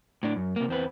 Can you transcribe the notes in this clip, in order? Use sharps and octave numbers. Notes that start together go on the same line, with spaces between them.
A2 D4
F#2
C3 A#3
E2 C4 B4